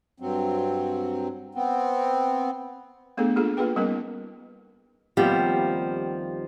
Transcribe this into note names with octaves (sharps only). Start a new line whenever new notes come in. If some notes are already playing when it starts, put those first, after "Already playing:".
G2 F#3 C4
B3 C4
A3 B3 D4 G#4 A4
A#3 D4 F4 G#4 A4
A#3 F4 G#4 B4 G5
G3 A#3 B3 C#4 D#4 A#4
D#2 F3 G3 B3 C4 G4